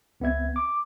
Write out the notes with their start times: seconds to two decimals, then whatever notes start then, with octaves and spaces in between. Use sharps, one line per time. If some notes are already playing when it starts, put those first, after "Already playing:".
0.20 C#2 B3 C4 E5 G#6
0.56 D6